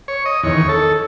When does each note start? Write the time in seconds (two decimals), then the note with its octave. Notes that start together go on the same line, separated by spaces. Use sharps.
0.08 C#5
0.26 D#5
0.43 E2 D#3 C#5
0.69 A4